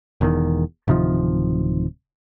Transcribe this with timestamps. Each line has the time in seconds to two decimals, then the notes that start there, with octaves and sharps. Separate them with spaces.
0.21 E1 E2 G#2 D#3
0.88 D1 C3 D#3 F3